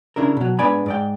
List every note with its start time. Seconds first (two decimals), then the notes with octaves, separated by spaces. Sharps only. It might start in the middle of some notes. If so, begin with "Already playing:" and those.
0.16 C#3 D4 E4 A#4
0.37 B2 F#3
0.59 G#2 B3 D4 D5 G#5 B5
0.86 G#2 D5 G5